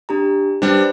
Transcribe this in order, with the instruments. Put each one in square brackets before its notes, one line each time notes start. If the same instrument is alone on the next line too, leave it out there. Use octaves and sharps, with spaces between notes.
[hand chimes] D4 G4 A#5
[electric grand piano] G3 D4 [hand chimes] B4 C5